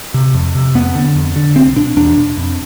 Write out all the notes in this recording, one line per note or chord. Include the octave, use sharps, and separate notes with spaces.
C3
F2
C3
F2 B3
D3
F2
D3
C2 C4
B2 D4
E2 D4
B2
F2